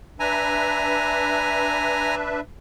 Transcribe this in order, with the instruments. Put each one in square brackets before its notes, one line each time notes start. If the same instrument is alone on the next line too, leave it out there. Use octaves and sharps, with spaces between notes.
[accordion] D4 B4 E5 [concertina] G#5 A#5